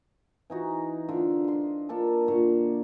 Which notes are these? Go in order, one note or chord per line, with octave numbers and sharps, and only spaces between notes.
E3 D#4 F#4
D3 F4
D#5 C6
A#3 D4 F4 A4
A#2 D3 C6 C#6